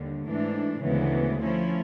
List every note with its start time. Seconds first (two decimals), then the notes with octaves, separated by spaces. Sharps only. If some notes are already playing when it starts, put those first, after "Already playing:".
Already playing: D#2 D3 G3
0.26 G#2 E3 A3 D4
0.82 D2 C#3 E3 G#3 B3
1.40 F3 A3 C#4 E4